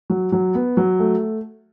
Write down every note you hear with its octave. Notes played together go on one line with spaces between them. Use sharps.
F#3
F#3
B3
F#3
A3